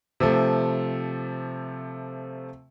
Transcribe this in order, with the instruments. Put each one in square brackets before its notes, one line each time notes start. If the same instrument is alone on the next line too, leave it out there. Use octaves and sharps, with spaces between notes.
[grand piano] C3 F3 A3